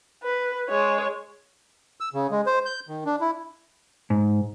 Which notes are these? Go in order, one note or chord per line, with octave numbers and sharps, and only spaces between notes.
B4
G#3 C#5
E6
C#3
G#3
C5
G6
D#3
D4
E4
G#2